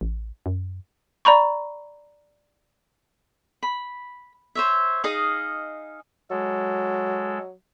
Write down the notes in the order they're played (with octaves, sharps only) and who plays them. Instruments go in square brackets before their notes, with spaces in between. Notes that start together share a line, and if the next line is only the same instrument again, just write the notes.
[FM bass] A1
F#2
[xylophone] D5 A#5 B5 C#6
[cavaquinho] B5
C5 C#5 E5
D#4 G#4 D#5 F5
[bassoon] F#3 [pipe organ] G#3 A4